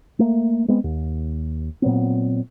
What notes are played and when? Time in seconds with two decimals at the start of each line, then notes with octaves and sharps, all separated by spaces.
0.19 A3 A#3
0.68 G#3 B3 C4
0.84 D#2
1.82 A#2 F#3 B3 C4